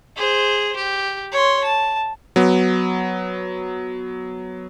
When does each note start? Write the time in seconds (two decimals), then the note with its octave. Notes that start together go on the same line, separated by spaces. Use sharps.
0.16 G#4 C5
0.76 G4
1.32 C#5 C6
1.64 A5
2.36 F#3 B3